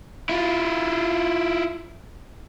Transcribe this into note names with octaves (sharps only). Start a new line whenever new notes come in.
E4 F4